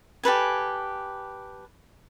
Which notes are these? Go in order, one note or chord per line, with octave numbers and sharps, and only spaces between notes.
G4 A4 B4 G#5